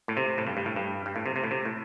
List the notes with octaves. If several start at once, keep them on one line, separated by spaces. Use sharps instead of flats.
A2
C3
A2
G2
G2
A2
G2
G2
A2
C3
C3
A2
C3
A2